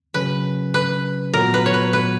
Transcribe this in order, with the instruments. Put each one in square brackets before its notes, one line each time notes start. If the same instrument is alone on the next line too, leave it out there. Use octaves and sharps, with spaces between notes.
[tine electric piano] C#3 F#3 C#4 [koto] B4
[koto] B4
[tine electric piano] A#2 F#3 B3 [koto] A#4
[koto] B4
C#5
B4
B4